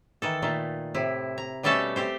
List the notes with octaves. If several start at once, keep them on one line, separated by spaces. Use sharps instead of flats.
D#3 E3 A4
A#2 D#3 A3
A2 C3 E4
A#5
B2 G3 A3 C#4 A4 A5
A3 C4 G4 C5